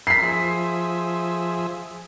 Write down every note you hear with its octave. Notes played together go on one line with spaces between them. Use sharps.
A#4 B5 B6 C7
F3 G#4 E5